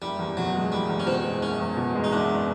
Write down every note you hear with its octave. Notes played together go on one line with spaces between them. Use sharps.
F#1 G3
E2
B2 F#3
G#3
F#1 G3
E2
C#4
B2 C4
G#3
F#1 C#4
E2
B2
G#3
D#4
F#1 D4